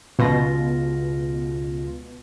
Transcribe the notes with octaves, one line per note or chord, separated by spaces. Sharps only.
C#2 B2 F4 A#6